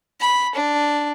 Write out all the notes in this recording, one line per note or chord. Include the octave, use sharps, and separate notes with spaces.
B5
D4